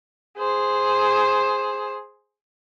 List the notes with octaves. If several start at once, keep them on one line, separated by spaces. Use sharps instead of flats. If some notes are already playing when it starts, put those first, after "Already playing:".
G#4 C5